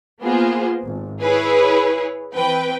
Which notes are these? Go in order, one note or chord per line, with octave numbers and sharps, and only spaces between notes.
A#3 B3 F4 G#4 C5
G#1
E4 G#4 B4 C#5
E3 C4 B4 G5